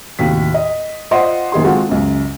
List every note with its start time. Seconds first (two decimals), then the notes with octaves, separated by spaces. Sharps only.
0.19 D#2 A2 C3 F#4 B6
0.54 D#5
1.11 F4 C5 D5 D#5 F#5 C6
1.52 F#1 D#3 G#4 C6
1.64 G#3 C4 F4 F#4 A4 F#5
1.89 C#2 F#2